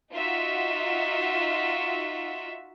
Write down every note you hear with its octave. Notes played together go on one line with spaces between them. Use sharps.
D#4 F4 F#4 E5